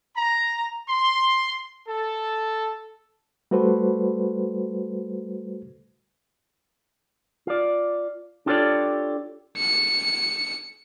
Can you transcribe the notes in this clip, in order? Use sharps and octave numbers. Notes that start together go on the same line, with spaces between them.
A#5
C6
A4
G3 A3 F#4 A4 B4 C5
F4 D5
D4 F4 G4 A4 C#5 D5
C#7